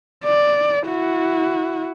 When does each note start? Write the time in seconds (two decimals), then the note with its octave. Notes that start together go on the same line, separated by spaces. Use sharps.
0.24 D5
0.85 E4 F#4